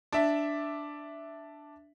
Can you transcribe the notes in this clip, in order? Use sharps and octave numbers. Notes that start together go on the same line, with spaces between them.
D4 E5